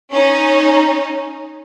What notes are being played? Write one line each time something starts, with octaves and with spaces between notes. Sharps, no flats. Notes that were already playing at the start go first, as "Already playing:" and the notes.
C#4 D#4